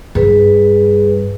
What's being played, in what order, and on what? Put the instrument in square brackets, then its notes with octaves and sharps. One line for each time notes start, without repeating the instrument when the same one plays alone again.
[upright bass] G2 [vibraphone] G#4 B4